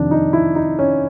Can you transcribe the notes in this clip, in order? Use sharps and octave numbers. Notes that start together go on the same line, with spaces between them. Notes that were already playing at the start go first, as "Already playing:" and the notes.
Already playing: F2 C3 D#3 D4
D#4
E4
D#4
C#4